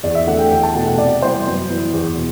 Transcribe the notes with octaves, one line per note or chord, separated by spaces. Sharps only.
E2 D5
E5
D3 A3 F#5
G5
E2 G5
A5
B2 A3 F#5
F#5
C3 D5
E3 G3 B3 C5
F#2
E3 B3
E2
B2